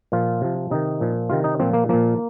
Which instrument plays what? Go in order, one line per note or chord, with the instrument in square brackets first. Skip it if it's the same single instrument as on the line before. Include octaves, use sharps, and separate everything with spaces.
[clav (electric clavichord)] A#2 F3 F4
C3 F3
C3 D#3 D#4
A#2 F3
C3 D#3 F4
D#4
A#2 F3 C4
A#3
A#2 F3 A#3